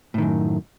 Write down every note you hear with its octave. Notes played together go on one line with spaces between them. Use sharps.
F#2 A2 D#3